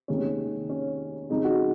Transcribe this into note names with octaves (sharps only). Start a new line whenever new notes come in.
F1 D#2 D#3 G#3 C#4
C#4
F2 C#3 G#3 D#4
F#4